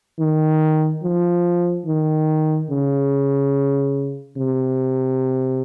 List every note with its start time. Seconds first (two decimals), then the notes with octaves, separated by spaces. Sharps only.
0.19 D#3
1.04 F3
1.86 D#3
2.70 C#3
4.37 C3